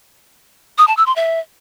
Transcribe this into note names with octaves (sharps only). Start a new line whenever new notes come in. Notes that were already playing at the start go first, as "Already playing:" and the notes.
D#6
A5
E6
C6
E5